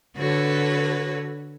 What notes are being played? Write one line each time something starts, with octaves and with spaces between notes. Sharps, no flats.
D3 F#4 A4 B4 C#5